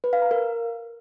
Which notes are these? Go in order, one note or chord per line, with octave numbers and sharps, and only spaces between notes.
B4
F5
A#5
A#4